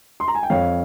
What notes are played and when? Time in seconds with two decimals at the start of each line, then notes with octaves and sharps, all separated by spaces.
0.20 C6
0.28 A#5
0.35 G#5
0.43 G5
0.50 F2 C#5 F5